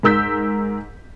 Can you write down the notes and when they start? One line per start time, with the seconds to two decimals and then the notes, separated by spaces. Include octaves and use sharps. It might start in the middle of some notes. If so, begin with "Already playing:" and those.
0.03 G#2 A#4 E6 G6 B6